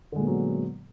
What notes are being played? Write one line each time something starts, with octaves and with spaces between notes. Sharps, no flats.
A#2 D3 F#3 G#3 B3